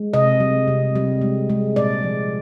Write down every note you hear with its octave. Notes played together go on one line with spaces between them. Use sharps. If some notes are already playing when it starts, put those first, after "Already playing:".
Already playing: G#3
C3 D#5
G3
C3
G3
G#3
G#3
A#2 D5
F3